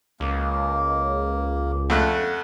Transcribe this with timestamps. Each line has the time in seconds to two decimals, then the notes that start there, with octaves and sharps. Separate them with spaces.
0.20 C#2 A#3
1.90 F2 A3 F#5 F#6